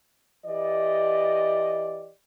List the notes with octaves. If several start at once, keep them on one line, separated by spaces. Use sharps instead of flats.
E3 G4 D5 D#5